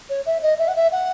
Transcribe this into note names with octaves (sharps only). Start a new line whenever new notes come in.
C#5
E5
D#5
E5
F#5
E5
F#5